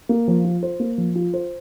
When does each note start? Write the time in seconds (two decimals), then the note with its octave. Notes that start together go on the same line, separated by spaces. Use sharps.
0.09 A#3
0.28 F3
0.45 F4
0.63 C5
0.80 A#3
0.98 F3
1.15 F4
1.34 C5